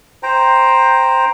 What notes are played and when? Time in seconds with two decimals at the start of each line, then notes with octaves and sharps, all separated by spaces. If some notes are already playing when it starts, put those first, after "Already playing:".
0.23 C5 G5 A#5